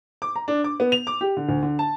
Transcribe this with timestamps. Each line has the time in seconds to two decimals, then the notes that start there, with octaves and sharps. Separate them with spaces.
0.22 D6
0.36 A#5
0.48 D4
0.64 D6
0.80 B3
0.92 F7
1.07 D6
1.21 G4
1.37 D3
1.49 D2
1.62 D3
1.79 A5